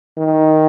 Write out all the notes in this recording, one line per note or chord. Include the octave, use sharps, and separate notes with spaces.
D#3